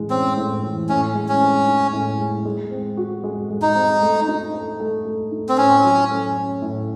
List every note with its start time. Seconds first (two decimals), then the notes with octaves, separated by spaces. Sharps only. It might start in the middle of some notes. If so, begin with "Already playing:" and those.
Already playing: A2 E3 G#3
0.10 C4 C#4
0.37 A2
0.63 E3
0.89 A2 C#4
1.15 G#3
1.29 C#4
1.41 C4
1.67 D#4
1.93 A2
2.19 G#3
2.45 G#3
2.71 C4
2.97 F#4
3.24 G#3
3.50 G#3
3.62 D#4
3.75 C4
4.02 A3
4.28 D#4
4.54 A4
4.80 A3
5.05 A3
5.32 D#4
5.49 C4
5.58 A2 C#4
5.84 F#3
6.10 A3
6.36 C#4
6.62 A2